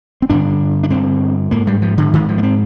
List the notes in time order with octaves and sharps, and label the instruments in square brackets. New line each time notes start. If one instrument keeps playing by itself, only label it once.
[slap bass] C4
G2 D3 D4
D4
G2 D3 C4
G#2 A#3
G3
F3
D3
G#2 D#3
F3
A#3
C4